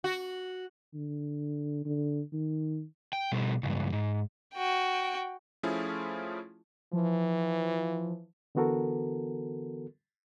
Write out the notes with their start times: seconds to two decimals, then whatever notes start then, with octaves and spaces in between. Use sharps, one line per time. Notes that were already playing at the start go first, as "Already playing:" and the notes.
0.04 F#4
0.94 D3
1.85 D3
2.33 D#3
3.13 G5
3.32 B2 G3
3.63 C#2 G2
3.92 G#2
4.54 F#4 G5
5.63 F3 A3 C#4 E4 F4 G#4
6.93 E3 F3
8.55 D3 E3 B3 F#4 A4 A#4